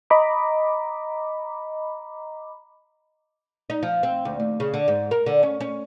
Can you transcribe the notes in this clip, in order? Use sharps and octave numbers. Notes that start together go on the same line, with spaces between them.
D#5 A#5 B5 D6
D#4
F3
C4
D2
D#2
C#3
D3
G#2
A#4
D3
C#4
C#4